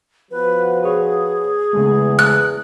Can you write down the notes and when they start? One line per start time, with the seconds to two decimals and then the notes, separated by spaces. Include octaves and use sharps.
0.31 F3 B3 F#4 B4
0.83 G#4 B4 C#5
1.73 E2 C#3 G#3 A3
2.19 F#6